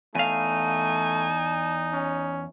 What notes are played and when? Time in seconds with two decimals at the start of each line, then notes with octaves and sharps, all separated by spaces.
0.15 E2 A3 D#4 F5 G#5
1.93 C#4